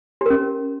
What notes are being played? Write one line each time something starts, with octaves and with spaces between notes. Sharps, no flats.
C#4 G4 A#4